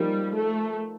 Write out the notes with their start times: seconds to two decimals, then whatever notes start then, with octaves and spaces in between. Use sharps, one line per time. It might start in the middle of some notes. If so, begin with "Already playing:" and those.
Already playing: F3 G3 A#3 D#4 A#4
0.34 A3